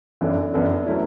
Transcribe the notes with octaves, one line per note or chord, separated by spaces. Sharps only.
F#2 E3 B3 D4 A4
F#2 E3 B3 D4 A4
F#3 A3 C#4 E4